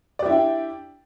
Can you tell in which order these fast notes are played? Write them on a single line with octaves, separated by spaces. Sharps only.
D5 G4 E4 D4 G5